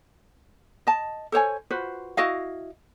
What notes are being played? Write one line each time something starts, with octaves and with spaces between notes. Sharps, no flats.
D#5 A5
A4 C5 C#5 G#5
F4 F#4 B4 C5
E4 F#4 D#5 F5